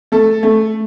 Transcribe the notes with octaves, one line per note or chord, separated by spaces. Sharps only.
A3 A4
A3